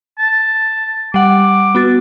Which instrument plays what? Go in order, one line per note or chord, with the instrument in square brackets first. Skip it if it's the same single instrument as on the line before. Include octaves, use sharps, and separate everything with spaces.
[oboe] A5
[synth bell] G3 F#5 [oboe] D6
[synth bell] B3 F#4 A6